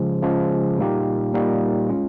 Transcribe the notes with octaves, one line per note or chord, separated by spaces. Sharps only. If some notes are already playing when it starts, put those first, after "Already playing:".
Already playing: C#3 F3 G#3
C#3 F3 G#3
A#2 G3 A#3 D#4 G4
A#2 G3 A#3 D#4 G4
G#3 C#4 F4